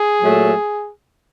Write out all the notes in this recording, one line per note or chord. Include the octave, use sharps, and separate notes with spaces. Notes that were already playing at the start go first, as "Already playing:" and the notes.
Already playing: G#4
A#2 F#3 A3